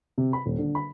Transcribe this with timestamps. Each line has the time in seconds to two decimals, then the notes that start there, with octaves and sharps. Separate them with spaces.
0.18 C3
0.33 B5
0.46 D#1
0.58 D3
0.75 B5